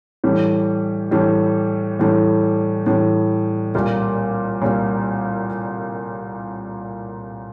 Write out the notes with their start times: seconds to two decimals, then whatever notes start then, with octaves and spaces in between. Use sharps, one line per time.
0.24 A2 E3 G3
1.11 A2 E3 G3
1.99 A2 E3 G3
2.87 A2 E3 G3
3.75 C2 A#2 G3 A#3
4.62 C2 A#2 G3 A#3